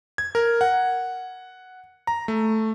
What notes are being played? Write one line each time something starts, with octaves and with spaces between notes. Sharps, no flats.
G#6
A#4
F#5
A#5
A3